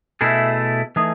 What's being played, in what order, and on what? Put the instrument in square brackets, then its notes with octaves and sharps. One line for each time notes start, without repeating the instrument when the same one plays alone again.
[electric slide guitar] B2 A3 E4 G#4
E3 A3 D#4 G#4